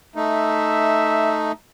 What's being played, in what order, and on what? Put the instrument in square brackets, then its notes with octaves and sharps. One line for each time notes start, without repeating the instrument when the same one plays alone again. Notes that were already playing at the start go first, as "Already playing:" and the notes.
[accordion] A3 D#4 [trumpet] E5